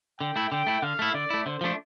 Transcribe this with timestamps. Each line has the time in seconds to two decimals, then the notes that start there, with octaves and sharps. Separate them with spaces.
0.20 D3 G5
0.36 A3 E4
0.52 D3 G5
0.67 A3 E4
0.82 D3 F5
0.99 A3 E4
1.14 D3 D5
1.30 A3 E4
1.46 D3 C5
1.61 F3 A3 D4